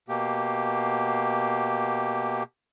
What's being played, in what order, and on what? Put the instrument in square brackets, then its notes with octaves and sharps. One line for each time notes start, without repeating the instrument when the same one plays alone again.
[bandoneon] B2 A#3 G4